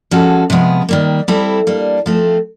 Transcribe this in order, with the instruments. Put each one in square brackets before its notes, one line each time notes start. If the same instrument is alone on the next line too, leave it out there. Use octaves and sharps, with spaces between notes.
[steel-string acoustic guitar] F3 G#3 C#4 F#4 A4
C3 F3 G#3 B3
D#3 G3 A#3
G3 C4 E4 A4
G3 A#3 D4
F3 A3 C4